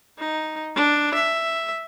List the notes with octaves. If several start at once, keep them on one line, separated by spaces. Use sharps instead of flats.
D#4
D4
E5